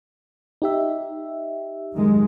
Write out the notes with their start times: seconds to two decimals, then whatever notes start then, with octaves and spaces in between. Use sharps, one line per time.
0.62 D#4 G4 E5
1.95 F#2 D#3 G#3